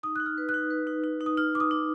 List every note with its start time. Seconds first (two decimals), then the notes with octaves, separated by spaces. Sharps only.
0.03 D#4 D#6
0.16 D#4 F#6
0.26 F6
0.38 B4
0.49 F#6
0.54 D#4
0.70 B4
0.87 D#4
1.04 D#4
1.21 D#4
1.26 D#6
1.37 D#4 F6
1.54 D#4 D6
1.60 D#6
1.71 D#4 D6